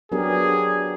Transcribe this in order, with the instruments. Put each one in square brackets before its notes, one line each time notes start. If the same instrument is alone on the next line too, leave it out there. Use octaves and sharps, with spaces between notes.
[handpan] F#3 B3 D4 G4 A#4 [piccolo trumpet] G#4